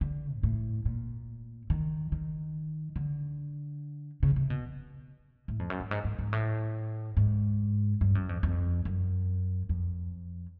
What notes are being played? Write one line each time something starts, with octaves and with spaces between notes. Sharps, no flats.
D3
G#2
A2
A#2
D#3
D#3
D3
C#3
C3
B2
A2
F2
F#2
G2
G#2
G#2
G#2
A2
G#2
G2
F#2
F2
F2
F#2
F2